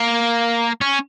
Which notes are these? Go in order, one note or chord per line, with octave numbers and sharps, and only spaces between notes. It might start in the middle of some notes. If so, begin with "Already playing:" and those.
Already playing: A#3
C#4